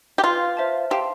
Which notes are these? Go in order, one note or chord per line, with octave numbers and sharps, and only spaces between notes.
G4
F4 B4 F5 C6
C5 E5 A5
G4 F5 A5 C6